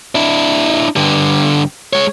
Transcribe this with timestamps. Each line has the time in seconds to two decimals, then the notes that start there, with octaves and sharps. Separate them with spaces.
0.15 D4 E4
0.96 G2 D3
1.93 G#3 C#5